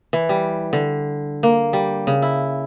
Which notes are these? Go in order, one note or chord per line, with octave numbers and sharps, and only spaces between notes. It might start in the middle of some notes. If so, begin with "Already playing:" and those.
E3
G3
D3
A#3
G3
C#3
E4